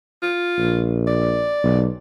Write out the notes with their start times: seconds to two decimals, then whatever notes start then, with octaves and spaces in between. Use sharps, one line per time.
0.23 F4
0.58 A#1
1.07 D5
1.63 B1